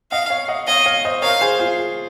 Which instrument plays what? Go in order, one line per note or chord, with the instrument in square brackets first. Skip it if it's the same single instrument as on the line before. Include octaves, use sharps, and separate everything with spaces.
[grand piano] D#5 F#5 [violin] F5
[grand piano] C#5 F5
D#5 F#5
[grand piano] C#5 F5 [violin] D#5
[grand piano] C#5 F5
C5 D#5
[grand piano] A#4 C#5 [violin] F5
[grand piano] G#4 C5
F4 G#4